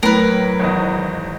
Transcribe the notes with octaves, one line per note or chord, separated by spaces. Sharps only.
A2 F#3 A#4 B4
G#1 E2 D#5